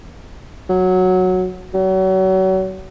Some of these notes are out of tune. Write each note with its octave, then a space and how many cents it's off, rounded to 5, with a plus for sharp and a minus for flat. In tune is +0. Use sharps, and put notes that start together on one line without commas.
F#3 -5
F#3 +35